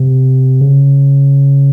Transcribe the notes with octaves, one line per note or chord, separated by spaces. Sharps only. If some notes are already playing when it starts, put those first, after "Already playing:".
Already playing: C3
C#3